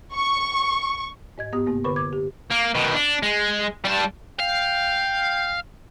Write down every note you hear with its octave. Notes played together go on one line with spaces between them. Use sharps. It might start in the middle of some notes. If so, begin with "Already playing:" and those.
C#6
G#2 D#5 G#6
G2 B3 G4 D#6
G2 C3 A#3 B3
F#2 D3 A#4 B4 B5 C#6
D6 G#6
G4
A#3
B2 D#3
D4
G#3
G3 A5
F5 G5